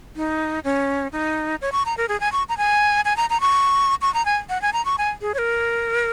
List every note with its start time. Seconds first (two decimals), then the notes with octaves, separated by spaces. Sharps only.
0.16 D#4
0.64 C#4
1.12 D#4
1.61 C#5
1.72 C#6
1.85 A#5
1.97 A#4
2.08 G#4
2.20 G#5
2.32 C#6
2.49 A#5
2.58 G#5
3.05 G#5
3.17 A#5
3.30 A#5
3.41 C#6
4.01 C#6
4.14 A#5
4.25 G#5
4.49 F#5
4.62 G#5
4.73 A#5
4.85 C#6
4.98 G#5
5.21 G#4
5.34 C#5
5.38 A#4